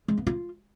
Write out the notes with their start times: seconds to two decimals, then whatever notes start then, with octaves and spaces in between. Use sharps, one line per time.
0.08 G#3
0.17 B3
0.27 F4